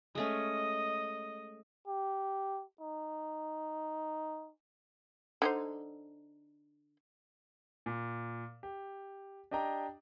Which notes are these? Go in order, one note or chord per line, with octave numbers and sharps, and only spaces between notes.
G#3 A3 C#4 D#5
G4
D#4
D3 D#4 C5
A#2
G4
D4 G4 D#5 G5 A#5